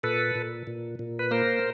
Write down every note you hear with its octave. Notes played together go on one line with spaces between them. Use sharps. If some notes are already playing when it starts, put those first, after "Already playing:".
A#2 A4 B4
A#2
A#2
A#2
B4
A#3 A#4 C5